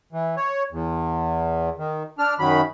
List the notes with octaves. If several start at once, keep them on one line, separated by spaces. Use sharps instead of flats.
E3
C#5
E2
D#3
D4 F6
F#2 D#3 F#3 B5